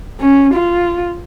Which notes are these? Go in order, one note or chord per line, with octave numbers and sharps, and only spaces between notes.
C#4
F4